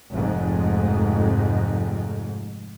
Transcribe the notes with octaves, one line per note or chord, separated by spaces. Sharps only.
F1 F2 G#2